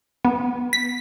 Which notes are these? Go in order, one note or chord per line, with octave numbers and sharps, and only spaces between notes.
B3
B6